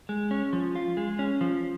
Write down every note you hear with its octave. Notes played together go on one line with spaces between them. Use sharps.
G#3
C#4
F3
F4
G#3
C#4
F3